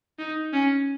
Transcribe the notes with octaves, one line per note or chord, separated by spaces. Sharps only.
D#4
C#4